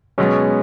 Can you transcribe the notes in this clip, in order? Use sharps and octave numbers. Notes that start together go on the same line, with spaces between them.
B2 F#3 G#3 B3 C#4